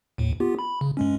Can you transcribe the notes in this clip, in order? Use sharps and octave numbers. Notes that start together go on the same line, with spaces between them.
D#2 A2
B3 F4 G4
B5
C#3
G2 G#3 C#4